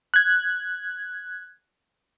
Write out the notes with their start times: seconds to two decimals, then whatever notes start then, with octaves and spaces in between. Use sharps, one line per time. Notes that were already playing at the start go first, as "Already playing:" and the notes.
0.14 F#6 G#6